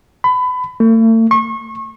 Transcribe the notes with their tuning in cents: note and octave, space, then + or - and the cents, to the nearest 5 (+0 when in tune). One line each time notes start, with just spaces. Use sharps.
B5 +25
A3 +40
C#6 -35